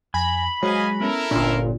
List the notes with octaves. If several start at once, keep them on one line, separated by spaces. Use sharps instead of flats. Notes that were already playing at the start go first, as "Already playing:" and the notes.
F2 G#5 B5 A#6
F#3 G#3 F#4 C5 C#5 D#5 F5 G#5
B3 C#4 E4 A4 A#4
G1 A#2 C#4 D4 F4